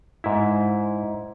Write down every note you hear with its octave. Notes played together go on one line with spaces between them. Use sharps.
G#2 E4